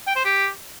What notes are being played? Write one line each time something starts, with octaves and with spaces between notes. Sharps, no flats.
G5
C5
G4